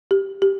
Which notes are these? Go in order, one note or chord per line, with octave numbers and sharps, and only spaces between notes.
G4
G4